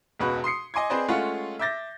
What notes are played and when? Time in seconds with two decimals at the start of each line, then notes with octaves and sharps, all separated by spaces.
0.20 E1 C#2 B2 F#4 B4
0.44 C6 D#6 C7 C#7
0.74 D#5 G#5 C6 D6 G#6
0.90 C4 G#4 B4 C5 D5 D#5
1.08 G#3 A3 C#4 F4 F5 F#5
1.59 E5 D6 G6 A6 A#6